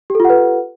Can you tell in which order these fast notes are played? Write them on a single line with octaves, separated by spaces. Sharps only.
G4 A4 F4 F#5 B4